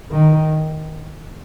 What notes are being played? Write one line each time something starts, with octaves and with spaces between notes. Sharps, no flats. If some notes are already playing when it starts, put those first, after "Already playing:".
D#3